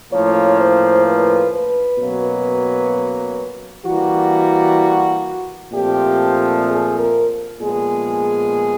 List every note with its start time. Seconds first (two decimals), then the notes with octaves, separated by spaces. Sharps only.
0.11 A2 F3 A#3 C#4 C#5
0.58 C5
1.05 B4
1.51 B4
1.97 B2 F#3 A#3 C#4
3.85 E3 G3 A#3 F#4
5.72 A#2 F3 A3 C4 G4
6.65 G#4
6.97 A#4
7.59 A#2 F3 G#3 B3 G#4